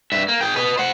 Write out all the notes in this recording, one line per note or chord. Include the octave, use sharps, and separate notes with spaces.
G2 E5
A#3
G#4 G5
B4 D#5
C5 F#5